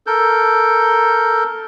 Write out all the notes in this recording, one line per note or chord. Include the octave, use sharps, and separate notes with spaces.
A4 A#4 G6